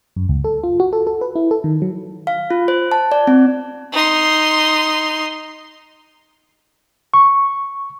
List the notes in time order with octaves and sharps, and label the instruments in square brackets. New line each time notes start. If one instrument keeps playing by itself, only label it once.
[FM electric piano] F#2
C#2
A4
F4
F#4
A4
A4
B4
E4
A4
D#3
F#3
[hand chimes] F5
F4
C5
A5
D5
C4
[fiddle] D#4 C6
[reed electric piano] C#6